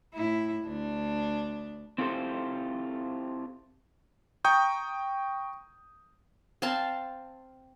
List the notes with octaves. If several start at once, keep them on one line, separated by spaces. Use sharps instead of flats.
A2 E4
D2 D4
C4 E4 F4 G4 A4 C5
G5 A#5 C#6 D#6 G6
C4 F5 A5 C6